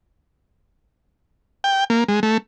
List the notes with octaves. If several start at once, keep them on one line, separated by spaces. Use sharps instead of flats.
G5
A#3
G#3
A3